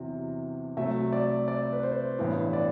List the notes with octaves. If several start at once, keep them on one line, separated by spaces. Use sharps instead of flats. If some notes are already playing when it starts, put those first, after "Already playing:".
Already playing: E2 C3 F#3
C2 C3 F#3 A3 E5
D5
D5
B4
C5
A1 G2 E3 B3 B4
D5